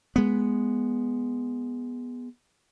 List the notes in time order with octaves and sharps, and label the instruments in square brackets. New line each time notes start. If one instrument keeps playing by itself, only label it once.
[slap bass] G#3 B3